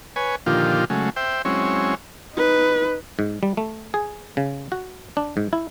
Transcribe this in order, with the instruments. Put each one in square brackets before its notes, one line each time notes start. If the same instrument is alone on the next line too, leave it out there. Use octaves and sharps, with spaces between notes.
[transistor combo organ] B4 C#5 G#5
A#2 D3 D#3 F3 F4 G4
C#3 F#3 G#3 A3
C5 E5 G5
F#3 G#3 C4 C#4 E4 C#5
[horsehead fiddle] D#4 B4
[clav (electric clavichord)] G#2
G3
A3
G#4
C#3
F#4
D4
G#2
E4